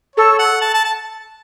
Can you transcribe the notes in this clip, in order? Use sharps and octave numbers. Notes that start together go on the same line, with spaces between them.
A4 C#5
F#5
A5
A5
A5